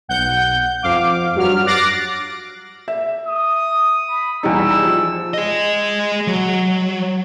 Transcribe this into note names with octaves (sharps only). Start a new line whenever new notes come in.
B1 F#5 G6
F2 F5 D6
G2 F#3 F6
D6 F#6 A6 A#6 C7 D7
E5
D#6
B5
E2 G3 D#4 E6
F3
G#4 D#5
F#3